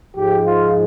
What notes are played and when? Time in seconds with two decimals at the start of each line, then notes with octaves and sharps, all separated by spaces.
0.17 G#2 F3 G#3 G4
0.46 F4